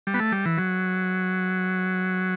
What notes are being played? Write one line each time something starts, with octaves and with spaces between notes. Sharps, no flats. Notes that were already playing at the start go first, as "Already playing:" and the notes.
G3
B3
A3
G3
E3
F#3